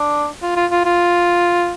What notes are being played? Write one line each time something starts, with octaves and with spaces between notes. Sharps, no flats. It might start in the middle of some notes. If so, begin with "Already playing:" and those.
Already playing: D4
F4
F4
F4
F4